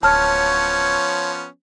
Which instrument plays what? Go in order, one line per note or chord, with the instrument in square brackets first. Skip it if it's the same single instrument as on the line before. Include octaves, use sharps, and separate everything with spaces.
[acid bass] D1 [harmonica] F3 B3 C#4 [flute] C#5 [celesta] A5 F6